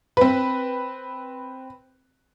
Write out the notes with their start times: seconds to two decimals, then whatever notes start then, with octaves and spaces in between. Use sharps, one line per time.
0.17 C4 B4